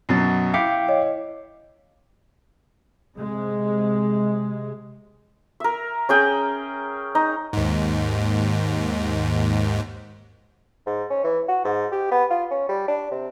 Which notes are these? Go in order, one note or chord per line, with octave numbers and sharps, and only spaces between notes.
F#2 B2 F#3 A6 C7
E4 F5 G5 D6 G6 B6 C#7
C#5 D#5
C3 G#3
A#4 E5
C#4 G#4 G5
D#4
D#2 G#2
G#2
C#4
E3
F#4
G#2
G4
B3
F4
C#4
G3
D4
C3